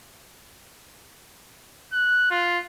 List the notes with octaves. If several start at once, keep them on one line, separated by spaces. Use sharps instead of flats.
F#6
F4